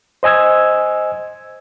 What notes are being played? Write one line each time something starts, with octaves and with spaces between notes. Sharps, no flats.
C5 D#5 G#5 E6 G#6